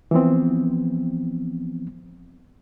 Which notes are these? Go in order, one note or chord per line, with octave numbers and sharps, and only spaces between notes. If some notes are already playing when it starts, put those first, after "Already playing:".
E3 F3 B3 C4